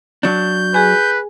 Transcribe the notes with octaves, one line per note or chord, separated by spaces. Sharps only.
F#3 D4 G6
G#4 B4 G#5